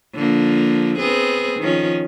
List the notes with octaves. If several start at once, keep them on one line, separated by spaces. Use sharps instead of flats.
D3 F3 A#3
B3 C4 G#4
D#3 F3 C#4